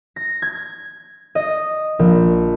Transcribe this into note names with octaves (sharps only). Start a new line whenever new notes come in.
A#6
G#6
D#5
A#1